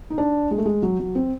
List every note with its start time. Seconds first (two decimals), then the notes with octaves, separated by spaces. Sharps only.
0.10 D#4
0.18 D4
0.51 G#3
0.58 A3
0.66 G#3
0.82 F#3
0.99 F#3
1.15 C4